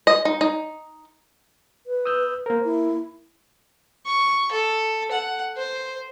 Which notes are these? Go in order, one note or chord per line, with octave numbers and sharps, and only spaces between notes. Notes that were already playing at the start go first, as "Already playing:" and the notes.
D#5
D#4
D#4
B4
D#6 E6 G6
A#3 A#4 C5
E4
C#6
A4
F#5
C5